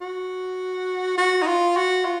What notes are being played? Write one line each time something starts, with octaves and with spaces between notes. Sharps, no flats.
F#4
F#4
D#4
F4
F#4
F4